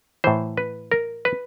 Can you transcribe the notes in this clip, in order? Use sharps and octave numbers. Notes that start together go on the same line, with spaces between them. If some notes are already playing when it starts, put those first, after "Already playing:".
A2 E3 C5
B4
A#4
B4